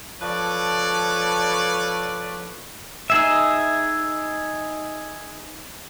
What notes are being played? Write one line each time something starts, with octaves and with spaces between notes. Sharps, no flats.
F3 A4 B4 C#5 D5
D#4 G#4 E5